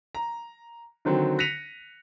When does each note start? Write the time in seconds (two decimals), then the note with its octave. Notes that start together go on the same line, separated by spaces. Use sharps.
0.15 A#5
1.05 D3 D#3 F#3 C4
1.39 F#6 A#6 B6 C#7 D#7 F7